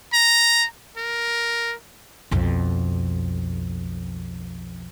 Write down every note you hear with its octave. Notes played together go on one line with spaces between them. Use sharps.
A#5
A#4
B1 F2